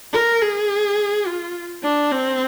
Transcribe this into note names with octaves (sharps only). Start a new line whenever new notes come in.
A#4
G#4
F4
D4
C4